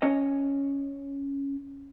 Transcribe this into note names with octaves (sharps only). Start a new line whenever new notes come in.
C#4 C#5 D#5